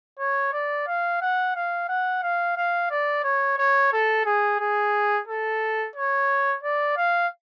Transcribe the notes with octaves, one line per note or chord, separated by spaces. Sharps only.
C#5
D5
F5
F#5
F5
F#5
F5
F5
D5
C#5
C#5
A4
G#4
G#4
A4
C#5
D5
F5